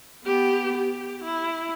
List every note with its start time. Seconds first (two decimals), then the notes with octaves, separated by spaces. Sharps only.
0.25 B3 G4
0.77 G4
1.24 E4